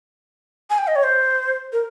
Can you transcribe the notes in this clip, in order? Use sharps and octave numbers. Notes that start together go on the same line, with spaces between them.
G#5
G5
D#5
C#5
C5
A#4